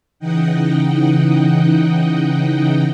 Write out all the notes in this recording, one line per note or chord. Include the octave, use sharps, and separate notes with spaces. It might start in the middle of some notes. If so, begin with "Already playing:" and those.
C#3 E3 D#4 D#5 F#5 G5